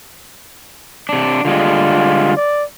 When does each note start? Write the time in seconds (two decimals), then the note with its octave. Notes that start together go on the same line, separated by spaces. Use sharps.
1.09 C3 D4
1.45 D3 G3 G#3 F4
2.37 D5